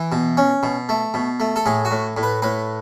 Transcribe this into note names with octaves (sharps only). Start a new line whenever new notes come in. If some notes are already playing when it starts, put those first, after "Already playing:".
Already playing: E3
B2
C#4
B2
A3
B2
A3
A4
A2 G#4
F#4
A2
A2
B4
A2 B4